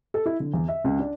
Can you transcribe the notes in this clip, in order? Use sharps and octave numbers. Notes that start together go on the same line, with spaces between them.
A4
E4
D3
E2
E5
C#2
D4